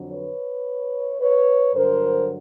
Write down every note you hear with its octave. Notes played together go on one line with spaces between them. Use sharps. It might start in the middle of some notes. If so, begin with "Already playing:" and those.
Already playing: F2 D3 F#3
B4 C#5
B4 C#5
G2 D3 F#3 A#4 C5